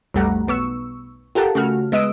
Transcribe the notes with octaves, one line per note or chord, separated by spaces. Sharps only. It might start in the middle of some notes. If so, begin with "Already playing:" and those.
B1 F2 G3 A3 F#5 A#5
B1 B3 C#6 E6
F4 G4 A4 A#4 F#5 A5
C#3 A3 F#4 F6
G#3 B3 D#5 D#6 E6 D7